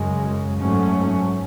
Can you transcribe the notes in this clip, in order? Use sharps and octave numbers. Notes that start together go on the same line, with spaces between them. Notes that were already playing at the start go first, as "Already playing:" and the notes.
Already playing: F#2 C#3 G#3
G#2 F#3 A3 C#4